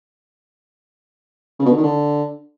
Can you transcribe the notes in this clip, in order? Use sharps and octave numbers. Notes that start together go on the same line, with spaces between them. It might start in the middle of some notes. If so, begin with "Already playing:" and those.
C#3
B2
D3
D#3
D3